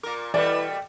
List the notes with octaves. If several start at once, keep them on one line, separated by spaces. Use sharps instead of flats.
A#2 A#4 D6
B2 E3 G3 A3 B4 D5